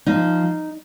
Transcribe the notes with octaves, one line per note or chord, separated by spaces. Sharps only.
F3 D#4